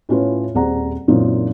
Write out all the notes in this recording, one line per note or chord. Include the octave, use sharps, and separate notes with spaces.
A2 C#4 F4 B4
D#1 C4 G#4 D5 F#5 A#5
F#2 A#2 E3 C4 D#4 F4